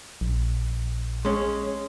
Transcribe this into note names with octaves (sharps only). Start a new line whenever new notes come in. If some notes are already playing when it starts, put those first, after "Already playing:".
A#1
G#3 C#4